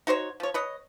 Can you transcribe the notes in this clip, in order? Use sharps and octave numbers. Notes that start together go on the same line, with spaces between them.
D#4 F#4 C5 C#5
F3 C#5
B4 C#5 D#5